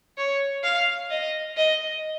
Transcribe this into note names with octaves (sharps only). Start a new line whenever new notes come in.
C#5
F5
D#5
D#5